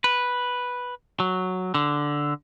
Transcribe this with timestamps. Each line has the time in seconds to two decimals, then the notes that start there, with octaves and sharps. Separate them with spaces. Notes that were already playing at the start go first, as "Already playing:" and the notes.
0.04 B4
1.20 F#3
1.74 D3